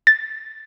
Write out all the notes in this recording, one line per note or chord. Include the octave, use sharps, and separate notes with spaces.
A6